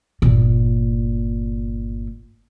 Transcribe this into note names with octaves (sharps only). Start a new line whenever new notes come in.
G1 A#2